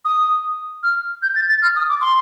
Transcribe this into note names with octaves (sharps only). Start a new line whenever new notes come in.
D#6
F6
G6
A6
A6
F6
D#6
D6
C6